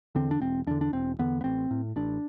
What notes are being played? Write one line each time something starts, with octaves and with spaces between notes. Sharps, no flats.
E2 D3 C4
D4
E1 C4
E2 D3 D4
D4
E1 C4
E2 D3 B3
B3
A1 C4
A2
A1 D4